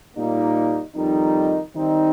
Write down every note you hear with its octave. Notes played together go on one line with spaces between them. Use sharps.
A#2 G3 A#3 D#4
F2 D#3 G3 D#4
D#3 G3 C4 D#4